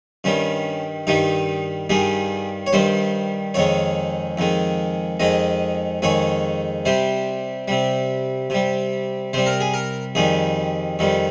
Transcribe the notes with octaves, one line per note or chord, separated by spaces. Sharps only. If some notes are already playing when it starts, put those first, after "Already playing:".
G2 D#3 G3 C#4
G2 D#3 G3 D#4
G2 D#3 G3 G#4
C#5
G2 D#3 G3 C5
F2 D#3 G#3 C#5
F2 D#3 G#3
F2 D#3 G#3 D#5
F2 D#3 G#3 C#5
C3 G3 C5
C3 G3
C3 G3
C3 G3 C5
A#4
G#4
A#4
F2 D#3 G3 G#4
F2 D#3 G3